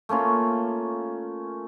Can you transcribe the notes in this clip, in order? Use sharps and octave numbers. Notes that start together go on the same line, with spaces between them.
A3 A#3 C#4 F4